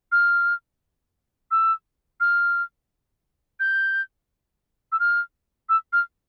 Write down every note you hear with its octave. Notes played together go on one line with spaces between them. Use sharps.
F6
E6
F6
G6
E6
F6
E6
F6